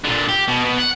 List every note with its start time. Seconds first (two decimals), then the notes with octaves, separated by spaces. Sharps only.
0.04 A#2 D3
0.29 G4
0.48 B2
0.65 B2
0.79 F#5